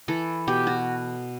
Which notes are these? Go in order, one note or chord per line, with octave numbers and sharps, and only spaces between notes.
E3 A4
B2 G4
F#4